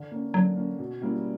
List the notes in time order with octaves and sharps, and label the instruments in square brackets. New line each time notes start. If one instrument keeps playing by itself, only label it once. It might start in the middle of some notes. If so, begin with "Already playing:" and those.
Already playing: [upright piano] D3
A#3 C#4
[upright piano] D3 [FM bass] F#3
[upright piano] A#3 C#4
B2
G3 A#3 C#4 E4